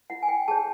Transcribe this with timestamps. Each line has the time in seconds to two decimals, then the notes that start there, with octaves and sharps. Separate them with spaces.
0.10 E4 F#5
0.23 G#5
0.28 G5
0.48 G#4 C#5 A5